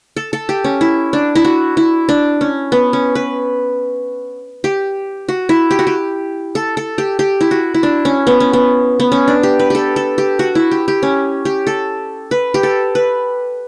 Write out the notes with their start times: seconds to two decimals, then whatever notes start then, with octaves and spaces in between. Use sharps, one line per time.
0.16 A4
0.33 A4
0.49 G4
0.64 C#4
0.81 E4
1.13 D4
1.35 E4
1.45 F#4
1.77 E4
2.09 D4
2.41 C#4
2.72 B3
2.93 C#4
3.15 B4
4.64 G4
5.28 F#4
5.49 E4
5.71 G4
5.79 F#4
5.87 G4
6.55 A4
6.77 A4
6.98 G4
7.19 G4
7.41 E4
7.51 F#4
7.74 E4
7.83 D4
8.05 C#4
8.27 B3
8.40 C#4
8.53 B3
9.00 B3
9.12 C#4
9.28 D4
9.43 G4
9.59 B4
9.70 G4 A4
9.96 A4
10.18 G4
10.39 F#4
10.55 E4
10.71 G4
10.88 G4
11.03 C#4
11.45 G4
11.67 A4
12.31 B4
12.54 G4
12.63 A4
12.95 B4